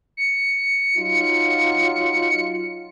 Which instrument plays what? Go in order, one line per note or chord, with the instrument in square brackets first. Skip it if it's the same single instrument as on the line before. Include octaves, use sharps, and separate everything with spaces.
[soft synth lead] C#7
[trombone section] F#3 D#4 F4